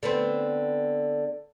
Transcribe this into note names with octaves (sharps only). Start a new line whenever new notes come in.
D3 B3 C4